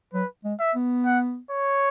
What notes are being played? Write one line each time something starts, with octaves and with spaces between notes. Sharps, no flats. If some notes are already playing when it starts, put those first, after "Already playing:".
F#3 B4
G#3
E5
B3
F#5
C#5